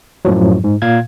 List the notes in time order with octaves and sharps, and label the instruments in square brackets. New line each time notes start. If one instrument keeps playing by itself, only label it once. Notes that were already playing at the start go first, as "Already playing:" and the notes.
[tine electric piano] F#2 A2 F3 F#3
G#2
A#2 F5 G#6